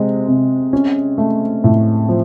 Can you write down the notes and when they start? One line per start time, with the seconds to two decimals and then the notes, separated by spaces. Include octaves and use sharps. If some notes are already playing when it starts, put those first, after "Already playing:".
Already playing: C3 G#3
0.28 C3
0.73 C#4
1.18 A3
1.64 A2
2.09 F3